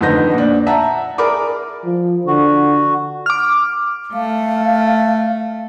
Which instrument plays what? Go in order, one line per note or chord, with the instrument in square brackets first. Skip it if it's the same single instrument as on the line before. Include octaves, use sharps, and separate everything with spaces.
[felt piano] F2 D3 D#3 B3 G6 A#6
A#2 D4
E5 F#5 A5 A#5
G#4 A#4 D5 B5 D6
[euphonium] F3
[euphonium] D3 [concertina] F#4
[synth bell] D6 F6
[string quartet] A3 [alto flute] F5